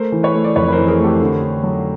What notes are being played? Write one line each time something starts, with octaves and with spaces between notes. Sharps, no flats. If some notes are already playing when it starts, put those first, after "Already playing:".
Already playing: A3 A#4 C5
E3
B4 C#5
A3
D5
F2 B4 C#5
B4
A#4 C5
E3
G#4 A#4
A3
G4 A4
D3
D3
F#3